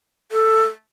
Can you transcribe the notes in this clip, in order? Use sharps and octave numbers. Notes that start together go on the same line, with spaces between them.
A4